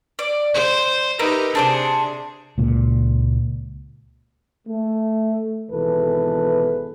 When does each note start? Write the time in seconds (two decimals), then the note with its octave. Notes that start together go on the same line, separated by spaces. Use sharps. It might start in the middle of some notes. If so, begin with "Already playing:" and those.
0.19 D5
0.54 C5
1.19 D#4 G4 A#4 B4 E5
1.55 C3 D4 G#4 C5 D6
2.58 C#2 A#2
4.68 A3
5.71 G#1 B2 E3 G#4 A4 B4